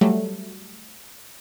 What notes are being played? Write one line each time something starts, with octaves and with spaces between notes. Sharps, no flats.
F#3 G3 A3